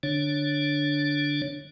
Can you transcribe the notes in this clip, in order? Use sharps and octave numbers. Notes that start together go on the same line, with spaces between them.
D3 D4 C#5